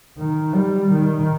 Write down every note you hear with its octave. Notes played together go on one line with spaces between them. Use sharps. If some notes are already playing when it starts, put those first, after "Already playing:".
D#3
G3
D#3